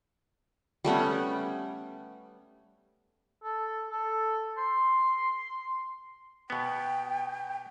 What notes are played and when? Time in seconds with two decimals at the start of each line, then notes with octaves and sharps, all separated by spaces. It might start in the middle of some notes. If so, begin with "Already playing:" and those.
0.85 G3 A3 B3 C#4
3.44 A4
3.91 A4
4.58 C6
6.50 B2 B3 G5